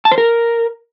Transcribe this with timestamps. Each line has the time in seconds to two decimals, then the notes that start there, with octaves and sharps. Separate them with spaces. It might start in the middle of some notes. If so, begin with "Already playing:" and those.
0.05 A5
0.11 C5
0.18 A#4